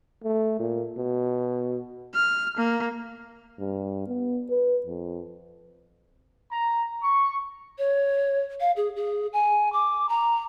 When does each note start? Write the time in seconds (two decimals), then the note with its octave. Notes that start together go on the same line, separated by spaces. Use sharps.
0.24 A3
0.59 A#2
0.97 B2
2.14 F6
2.57 A#3
3.59 G2
4.07 B3
4.50 B4
4.86 F2
6.51 A#5
7.03 C#6
7.78 C#5
8.60 F5
8.76 G#4
8.96 G#4
9.33 G#5
9.73 D6
10.09 A#5